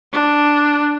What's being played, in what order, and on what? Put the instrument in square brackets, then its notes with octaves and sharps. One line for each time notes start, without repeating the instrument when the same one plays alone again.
[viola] D4